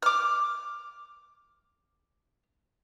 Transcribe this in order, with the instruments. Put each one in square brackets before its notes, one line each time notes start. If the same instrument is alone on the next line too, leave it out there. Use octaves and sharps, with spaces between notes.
[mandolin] D6 F6